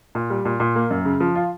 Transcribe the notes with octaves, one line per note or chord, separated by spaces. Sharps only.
A#2
G3
A#2
A#2
A#3
F#2
C#3
F3
F4